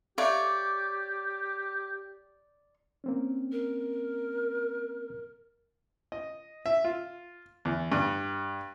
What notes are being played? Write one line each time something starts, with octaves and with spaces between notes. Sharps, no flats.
G4 A4 C#5 D5 E5 F5
A#3 C4 C#4
A#4
D#5
E5
F4
E2
G2